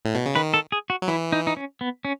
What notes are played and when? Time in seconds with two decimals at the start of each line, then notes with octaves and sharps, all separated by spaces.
0.05 A2
0.14 B2
0.26 C#3
0.35 D#3 B4
0.54 A4
0.72 G#4
0.90 F#4
1.02 F#3
1.08 E3 E4
1.32 D#4
1.47 D#4
1.57 C#4
1.81 B3
2.05 C#4